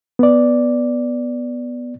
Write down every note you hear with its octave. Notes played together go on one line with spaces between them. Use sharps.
B3 D5